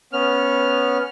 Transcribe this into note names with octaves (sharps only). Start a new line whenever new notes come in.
B3 C#4 F6